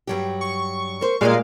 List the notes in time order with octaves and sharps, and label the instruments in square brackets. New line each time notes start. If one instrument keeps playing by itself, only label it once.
[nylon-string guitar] G2 F#3 G4
[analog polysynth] C#6
[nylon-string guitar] A#4 C5
[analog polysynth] A#2 G#3 F5 [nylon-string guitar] G3 A#3 D5